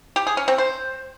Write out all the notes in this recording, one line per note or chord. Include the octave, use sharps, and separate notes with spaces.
G4
G#4
C#4
C4
C5